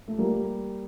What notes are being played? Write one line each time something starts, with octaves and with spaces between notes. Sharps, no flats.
A3
G3 A#3